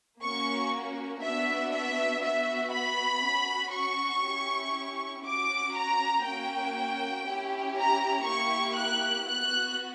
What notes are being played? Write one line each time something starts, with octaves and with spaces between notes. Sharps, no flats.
A#3 C#4 F#4 C#6
B3 D4 F#4 E5
E5
B3 F#4 E5
B5
C#4 F#4
C#6
C#4 E4 G4
C#4 F#4 D6
A#5
A#3 C#4 F#4 G5
C#4 E4 G4
A#5
A#3 E4 G4 C#6
F#6
B3 F#4 F#6